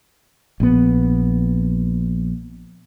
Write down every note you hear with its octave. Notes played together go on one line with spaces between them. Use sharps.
A#1 B3